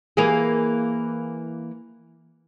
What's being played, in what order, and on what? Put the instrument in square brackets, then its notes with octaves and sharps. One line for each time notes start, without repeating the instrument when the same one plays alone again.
[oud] E3 A#3 G#4